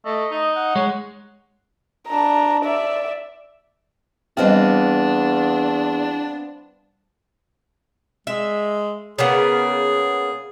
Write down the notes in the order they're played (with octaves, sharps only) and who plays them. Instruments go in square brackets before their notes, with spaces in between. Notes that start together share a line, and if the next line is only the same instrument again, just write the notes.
[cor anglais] A3 [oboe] D#5
[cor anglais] D#4
[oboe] F#5
[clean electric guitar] G#3 [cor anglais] C#5
[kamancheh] D4 A#5
D5 E5
[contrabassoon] E2 [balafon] G3 D#5 G5 [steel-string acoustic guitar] B3 C4 F5 [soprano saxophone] D4
[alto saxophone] G#3 [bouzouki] E5
[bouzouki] C#3 A#3 B3 [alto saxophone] G#4